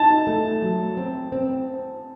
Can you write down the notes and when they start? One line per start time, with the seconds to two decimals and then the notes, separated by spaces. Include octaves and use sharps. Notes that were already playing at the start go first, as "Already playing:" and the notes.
Already playing: D#4 A5
0.27 A3
0.62 F#3
0.97 C4
1.32 C4